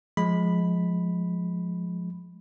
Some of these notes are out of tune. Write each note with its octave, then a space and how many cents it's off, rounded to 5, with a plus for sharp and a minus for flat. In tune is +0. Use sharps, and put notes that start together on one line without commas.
F3 +15 G#3 +15 B5 +0